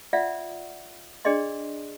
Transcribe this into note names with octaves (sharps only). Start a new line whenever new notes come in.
F4 D5 E5 F#5
D4 G#4 D5 D#5 C6